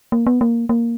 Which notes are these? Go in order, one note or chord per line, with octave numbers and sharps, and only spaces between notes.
A#3
B3
A#3
A#3